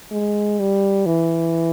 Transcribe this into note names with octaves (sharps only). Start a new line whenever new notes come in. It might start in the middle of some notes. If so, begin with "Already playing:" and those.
G#3
G3
E3